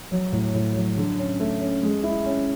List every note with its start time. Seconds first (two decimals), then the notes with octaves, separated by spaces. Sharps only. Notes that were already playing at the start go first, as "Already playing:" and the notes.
0.12 F#3
0.32 A2
0.54 A2
0.76 F#3
0.97 D3
1.18 C#4
1.40 A3
1.61 C#4
1.83 G#3
2.03 E4
2.25 C#4